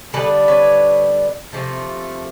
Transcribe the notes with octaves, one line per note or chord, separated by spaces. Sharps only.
D3 G3 B3 D4 A4 B4
B4 C#5
C3 F3 A3